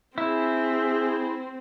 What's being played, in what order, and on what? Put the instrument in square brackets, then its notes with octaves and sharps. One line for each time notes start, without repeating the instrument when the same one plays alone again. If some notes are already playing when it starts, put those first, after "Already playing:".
[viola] C4 [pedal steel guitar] E4 [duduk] G#4